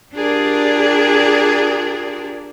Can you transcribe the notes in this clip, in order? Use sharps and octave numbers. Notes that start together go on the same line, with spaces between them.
D4 F4 G4 G#4 A#4 D5